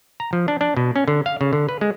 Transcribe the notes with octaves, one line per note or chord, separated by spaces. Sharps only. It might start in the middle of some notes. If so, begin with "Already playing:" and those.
A#5
F3
D4
D4
B2
C#4
D3
F5
C#3
D3
B4
G#3